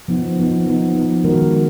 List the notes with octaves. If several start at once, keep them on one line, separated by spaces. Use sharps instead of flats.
F3 B3 D#4
F3 B3 D#4
F3 B3 D#4
F3 B3 D#4
D#3 G#3 D#4 F#4 A#4
F#4 A#4